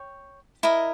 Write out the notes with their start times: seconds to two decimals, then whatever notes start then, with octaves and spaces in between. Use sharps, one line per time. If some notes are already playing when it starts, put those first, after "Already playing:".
Already playing: C#5 G5
0.63 E4 A#4 D#5